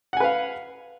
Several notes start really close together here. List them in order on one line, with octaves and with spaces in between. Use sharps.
F#5 G#5 B4 F5